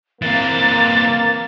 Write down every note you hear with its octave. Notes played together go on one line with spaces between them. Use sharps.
E3 A#3 C4 A6